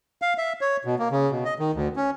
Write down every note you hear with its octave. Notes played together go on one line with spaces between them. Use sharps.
F5
E5
C#5
B2
A#3
C#3
B2
D#5
D#3
D2
C#4